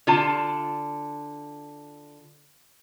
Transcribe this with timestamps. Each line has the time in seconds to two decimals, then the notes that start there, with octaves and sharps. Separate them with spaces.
0.07 D3 F4 A5